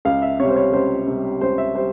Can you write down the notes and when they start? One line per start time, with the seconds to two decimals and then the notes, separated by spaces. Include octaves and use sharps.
0.05 C#2 F5
0.22 E5
0.40 C3 G3 C#5
0.49 C5
0.56 C#5
0.73 C#2 C5
1.07 C3 G3
1.41 C#2 C5
1.58 E5
1.75 G3 C5